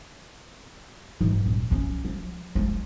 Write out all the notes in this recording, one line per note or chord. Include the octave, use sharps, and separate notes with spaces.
G#2 E3
D#1
F3 C#4
F3
F3 G#3